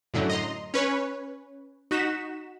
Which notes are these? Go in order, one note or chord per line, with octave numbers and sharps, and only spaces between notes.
F#2 A2 D3 F#3
D#5 A#5 C6
C#4 B4 C#5
D#4 F#4 B6 E7